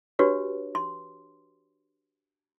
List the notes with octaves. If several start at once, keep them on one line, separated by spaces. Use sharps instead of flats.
D4 F#4 G4 B4 C#5
C6